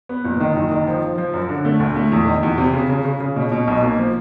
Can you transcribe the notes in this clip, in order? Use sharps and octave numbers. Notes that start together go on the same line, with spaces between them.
B3
F#1
D#3
F#1
D#3
F3
F3
F3
F#2
D3
A3
D2
A3
E2
D#3
E2
C3
C#3
C#3
C#3
C#3
B2
B2
B1
A#3
F3